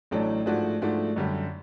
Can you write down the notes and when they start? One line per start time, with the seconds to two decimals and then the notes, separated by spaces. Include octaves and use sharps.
0.11 A1 A2 F#3 A3 D4
0.46 G#2 F3 A3 D4 F#4
0.81 G#2 F3 A3 D4 F#4
1.16 F#2 D3 G3